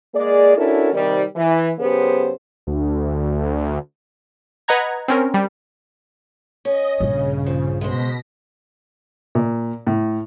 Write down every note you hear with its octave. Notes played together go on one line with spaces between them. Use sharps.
G#3 A#3 G#4 D5
C#4 D4 E4 F#4 A4 A#4
C3 D#3 G3
E3
F#2 C#3 B3 G4 G#4 C5
D2
B4 D#5 F#5 A#5 G#6
C4 C#4 A#4
G3
C#4 D#5
A#1 G2 C#3
F3
B2 G#3 C5 A#6 B6
A#2
A2